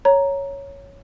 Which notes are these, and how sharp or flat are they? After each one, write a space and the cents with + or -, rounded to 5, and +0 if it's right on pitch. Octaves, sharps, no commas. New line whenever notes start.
C#5 +0 A#5 +0